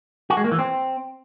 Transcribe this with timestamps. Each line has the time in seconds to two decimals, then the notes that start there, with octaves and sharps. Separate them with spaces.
0.30 F#4
0.37 G#3
0.44 A#3
0.52 E3
0.59 C4